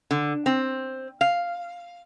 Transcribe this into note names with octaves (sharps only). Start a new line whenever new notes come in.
D3
C4
F5